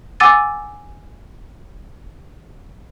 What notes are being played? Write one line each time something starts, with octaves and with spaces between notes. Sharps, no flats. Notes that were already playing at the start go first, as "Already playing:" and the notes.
F#5 G#5 D6 E6 A6 D#7